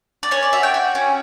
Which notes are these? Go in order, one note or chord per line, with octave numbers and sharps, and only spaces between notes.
D5
C#4 C#5
D5
F#4 E5
G5
F#4
C#4